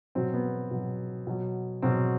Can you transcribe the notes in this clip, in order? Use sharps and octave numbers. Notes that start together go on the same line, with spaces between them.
B2 F#3 C4
B3
B2 F#3
B2 F#3
B2 F#3 C4